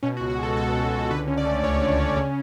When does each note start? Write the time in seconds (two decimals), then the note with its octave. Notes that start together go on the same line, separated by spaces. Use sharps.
0.03 B2 C#4
0.17 F#4
0.21 C#2
0.30 F#4
0.38 G#3 A4
0.56 C#2 A4
0.75 B2
0.93 C#2
1.11 D3 B4
1.28 C#4
1.37 D5
1.45 A3
1.63 D2 C#5
1.82 D3
1.99 C#4
2.17 C#3